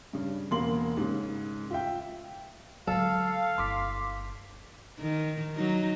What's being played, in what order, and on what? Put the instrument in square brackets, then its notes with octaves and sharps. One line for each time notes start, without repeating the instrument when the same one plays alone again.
[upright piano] G2 C#3
E1 A#3 C6 F#7
G#2 C#3
F4 E5 G5
[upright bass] D3 G#3 [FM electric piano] F#3 [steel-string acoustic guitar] A4 [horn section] F5
[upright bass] G1 E4 [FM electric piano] C6 D6 B6
[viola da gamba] D#3
F#3 D#4